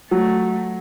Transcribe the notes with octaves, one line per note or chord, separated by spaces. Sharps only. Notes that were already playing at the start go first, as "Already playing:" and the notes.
F#3 A3